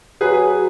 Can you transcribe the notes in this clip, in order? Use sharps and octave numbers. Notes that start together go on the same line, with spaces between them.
F#3 G#4 B4